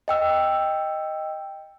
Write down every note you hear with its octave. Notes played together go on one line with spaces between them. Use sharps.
D#5 G5 E6